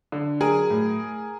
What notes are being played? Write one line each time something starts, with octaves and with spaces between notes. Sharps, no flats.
D3
F#3 G#4 A#4
A2